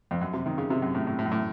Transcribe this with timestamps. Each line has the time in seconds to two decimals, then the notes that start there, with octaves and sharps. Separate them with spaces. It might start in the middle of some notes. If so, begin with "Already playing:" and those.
0.11 F2
0.21 F#2
0.33 C3
0.46 D#3
0.58 C#3
0.70 C3
0.82 F#2
0.95 A2
1.07 A2
1.19 A2
1.26 F#2
1.32 A2